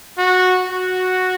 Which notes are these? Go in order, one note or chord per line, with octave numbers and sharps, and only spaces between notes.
F#4
F#4